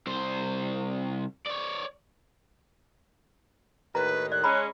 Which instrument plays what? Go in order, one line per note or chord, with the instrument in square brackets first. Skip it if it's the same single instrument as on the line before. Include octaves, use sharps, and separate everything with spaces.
[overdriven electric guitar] C2 C5
C#5 D5
[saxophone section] D#2 A2 D#3 [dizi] B4 [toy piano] A#5
[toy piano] D5 [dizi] F#6
[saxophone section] G#3 C#4 [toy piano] A#5 B5